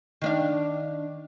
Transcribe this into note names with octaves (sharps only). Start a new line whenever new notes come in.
D#3 D4 F5